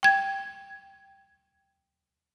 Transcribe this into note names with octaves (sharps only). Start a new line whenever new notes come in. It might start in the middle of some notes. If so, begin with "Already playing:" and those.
G5 G#6